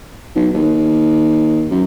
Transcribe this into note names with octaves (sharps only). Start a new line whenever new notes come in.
B1
D#2
F#2